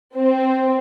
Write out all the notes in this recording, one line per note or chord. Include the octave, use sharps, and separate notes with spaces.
C4